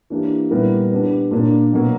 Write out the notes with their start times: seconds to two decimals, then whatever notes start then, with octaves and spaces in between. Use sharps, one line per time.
0.10 E3 A#3 D4 G4
0.51 A#2 G3 B3 E4 A#4
0.91 B3 D4 G4
1.31 A#2 A#3 D4 A#4
1.73 B2 F#3 A#3